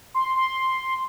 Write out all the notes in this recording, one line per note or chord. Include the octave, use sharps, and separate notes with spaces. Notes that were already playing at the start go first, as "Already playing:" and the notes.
C6
C6